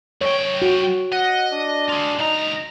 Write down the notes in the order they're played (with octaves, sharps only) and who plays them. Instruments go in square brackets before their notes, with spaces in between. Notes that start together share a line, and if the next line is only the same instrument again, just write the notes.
[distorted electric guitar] F#2 G5 [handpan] C#5
[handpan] F#4
[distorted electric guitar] D#5 [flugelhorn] F#5
[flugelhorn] D4
[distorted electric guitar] F4 G#4
[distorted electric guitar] C#2 A#5 [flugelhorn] D#4